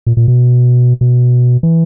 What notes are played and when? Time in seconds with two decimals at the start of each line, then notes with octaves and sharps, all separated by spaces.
0.07 A#2
0.17 A#2
0.28 B2
1.01 B2
1.63 E3